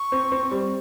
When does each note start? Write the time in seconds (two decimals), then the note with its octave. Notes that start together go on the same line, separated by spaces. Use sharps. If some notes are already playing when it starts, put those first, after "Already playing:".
Already playing: C#6
0.12 C4
0.32 C4
0.51 G3